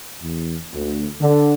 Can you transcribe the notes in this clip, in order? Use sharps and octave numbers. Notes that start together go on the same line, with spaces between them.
E2
D2
D3